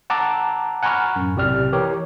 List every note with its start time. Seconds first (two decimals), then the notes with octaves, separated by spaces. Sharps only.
0.10 F#5 A5 A#5 D6 E6
0.83 F#5 G#5 A#5 B5 C#6 F6
1.16 F#2 A2
1.35 B1 A2 C3 G4 D5 F6
1.72 E3 G4 A#4 C#5